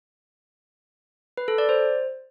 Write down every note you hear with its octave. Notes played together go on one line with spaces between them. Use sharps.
B4
A4
D5
C5